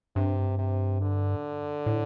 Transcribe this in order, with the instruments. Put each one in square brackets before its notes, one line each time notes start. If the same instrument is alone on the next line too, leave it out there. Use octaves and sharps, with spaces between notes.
[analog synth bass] G2 [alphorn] C3
[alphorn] C3
D3
[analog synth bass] A2